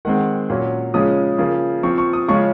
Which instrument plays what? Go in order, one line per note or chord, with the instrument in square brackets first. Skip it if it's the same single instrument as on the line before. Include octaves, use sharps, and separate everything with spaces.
[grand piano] D#3 G#3 C4 F#5
A#2 F#3 C#4
C#3 F3 G#3 C#4 D#6
C#3 F3 A#3
F3 C4 C#6
C#6
D#6
C#3 F3 G#3 C#4 C#6